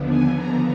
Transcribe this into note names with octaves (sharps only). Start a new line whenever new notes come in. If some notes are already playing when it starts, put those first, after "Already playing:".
Already playing: D#2 D3 F3 B3 D4
G#5
A#5